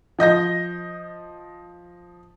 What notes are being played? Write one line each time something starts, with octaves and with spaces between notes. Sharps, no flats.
F3 D#5 G6 A#6